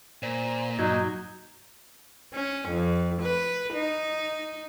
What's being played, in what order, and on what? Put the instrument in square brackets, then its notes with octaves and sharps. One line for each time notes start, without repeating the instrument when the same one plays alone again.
[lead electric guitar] A#2 [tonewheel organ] C5 D5
[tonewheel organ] G2 G6 G#6 [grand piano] F#3 [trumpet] D#4
[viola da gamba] C#4
F2
B4
D#4